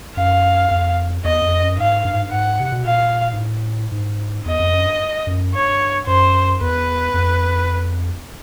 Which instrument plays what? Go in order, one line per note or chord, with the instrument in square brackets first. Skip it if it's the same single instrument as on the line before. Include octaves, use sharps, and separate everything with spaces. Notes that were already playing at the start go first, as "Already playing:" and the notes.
[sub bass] F#2 [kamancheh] F5
[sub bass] F2
[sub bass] E2 [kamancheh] D#5
[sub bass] F2
F#2
[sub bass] G#2 [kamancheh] F5
[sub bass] G2
G#2
G2
[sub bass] G#2 [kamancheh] F#5
[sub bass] C3
B2
[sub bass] A#2 [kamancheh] F5
[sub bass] G#2
A2
G#2
[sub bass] E2 [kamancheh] D#5
[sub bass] F2
F#2
G2
F#2
[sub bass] G2 [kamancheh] C#5
[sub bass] F#2 [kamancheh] C5
[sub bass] E2 [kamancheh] B4
[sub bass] F2